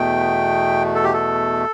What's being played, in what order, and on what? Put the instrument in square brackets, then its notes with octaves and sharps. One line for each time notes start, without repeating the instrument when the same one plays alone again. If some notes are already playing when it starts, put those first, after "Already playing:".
Already playing: [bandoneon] E2 B2 A3 G5
A4
G4
A4